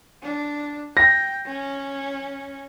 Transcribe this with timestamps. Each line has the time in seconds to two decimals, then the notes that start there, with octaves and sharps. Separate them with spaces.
0.23 D4
0.97 G5 A#6
1.46 C#4